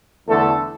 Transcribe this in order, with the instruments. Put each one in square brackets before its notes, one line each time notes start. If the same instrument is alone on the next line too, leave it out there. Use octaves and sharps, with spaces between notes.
[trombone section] E2 D3 A3 A4